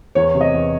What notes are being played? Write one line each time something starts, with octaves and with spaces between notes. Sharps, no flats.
E2 C#5
C3
D#5
E2